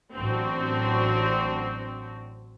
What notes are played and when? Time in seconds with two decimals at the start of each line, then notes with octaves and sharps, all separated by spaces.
0.14 A1 F#3 C4 D4 F#4